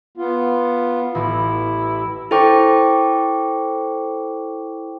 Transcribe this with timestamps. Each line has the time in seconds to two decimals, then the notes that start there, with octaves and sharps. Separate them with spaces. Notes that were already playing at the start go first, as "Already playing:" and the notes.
0.17 B3 F4
1.15 A1 E4
2.31 E4 A4 C5 G5 C#6 D6